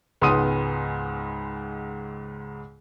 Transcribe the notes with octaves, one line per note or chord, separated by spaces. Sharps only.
C#2 G#2 B3 C6 D#6 D#7